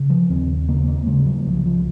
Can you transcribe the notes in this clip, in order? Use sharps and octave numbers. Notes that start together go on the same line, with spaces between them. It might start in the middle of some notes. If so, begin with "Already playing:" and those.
Already playing: C#3
F3
D#2 C4
C#3 A#3
A#3
C#3 G#3
F#3
C2 F3
F3